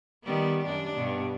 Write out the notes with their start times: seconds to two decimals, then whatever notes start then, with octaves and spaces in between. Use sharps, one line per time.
0.24 D#3 G3 B3
0.65 F#2 D4
0.96 G2 B2